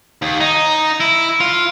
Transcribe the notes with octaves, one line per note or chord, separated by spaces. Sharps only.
D#2
D#4
E4
F4